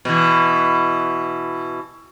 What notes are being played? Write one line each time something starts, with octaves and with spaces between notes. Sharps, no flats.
B2 E3